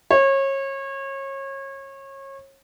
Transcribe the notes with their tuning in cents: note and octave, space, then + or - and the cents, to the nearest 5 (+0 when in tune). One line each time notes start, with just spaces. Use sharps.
C#5 -30